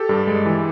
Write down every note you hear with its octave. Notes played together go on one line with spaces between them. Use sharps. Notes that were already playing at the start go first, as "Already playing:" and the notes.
Already playing: G4 A4
G2
G#3
E3